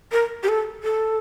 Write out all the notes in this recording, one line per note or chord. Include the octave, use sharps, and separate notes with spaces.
A#4
G4
A4
A4